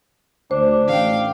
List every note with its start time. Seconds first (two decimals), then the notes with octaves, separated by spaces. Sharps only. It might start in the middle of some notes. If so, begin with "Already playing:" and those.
0.51 D2 D4 C5
0.87 A1 F5 G5